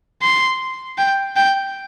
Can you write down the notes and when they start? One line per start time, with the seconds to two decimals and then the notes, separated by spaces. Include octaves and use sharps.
0.22 C6
0.98 G5
1.36 G5